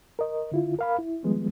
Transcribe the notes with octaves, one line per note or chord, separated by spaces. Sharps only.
A#4 D#5
D3 E4 F4
A#4 F5 B5
E4
D#3 F3 G3 G#3 B3